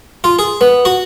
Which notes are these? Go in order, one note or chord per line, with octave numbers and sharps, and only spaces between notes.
F4
G#4
B3
F#4